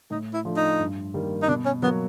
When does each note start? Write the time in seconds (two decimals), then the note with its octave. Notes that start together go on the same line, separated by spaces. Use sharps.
0.10 A2 D#4
0.33 E4
0.45 F3 A3 D4
0.57 D#4
0.79 G2
1.14 D#3 G3 A#3
1.42 D#4
1.48 B2 D4
1.65 C#4
1.82 F#3 B3
1.87 A#3